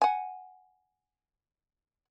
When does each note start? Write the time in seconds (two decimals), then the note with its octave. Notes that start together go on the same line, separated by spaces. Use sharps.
0.02 F#5 G#5